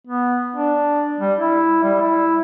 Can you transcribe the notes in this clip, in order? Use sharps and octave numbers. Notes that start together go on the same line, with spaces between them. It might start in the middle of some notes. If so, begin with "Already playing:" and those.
B3
D4
G3
E4
G3
E4